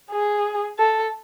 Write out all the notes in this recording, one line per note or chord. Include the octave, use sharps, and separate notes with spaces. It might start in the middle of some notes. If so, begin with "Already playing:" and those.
G#4
A4